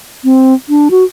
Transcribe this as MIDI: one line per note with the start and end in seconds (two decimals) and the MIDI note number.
0.24 0.54 60
0.69 0.89 62
0.91 1.04 66